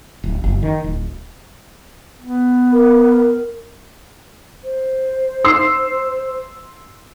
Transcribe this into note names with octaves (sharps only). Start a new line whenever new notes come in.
D1
F#1
D#3
D1
B3
A#4
C5
C6 E6 C7